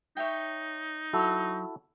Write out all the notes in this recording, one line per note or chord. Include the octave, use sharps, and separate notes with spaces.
D#4 C#5 E5 G5
F#3 E4 F#4 A4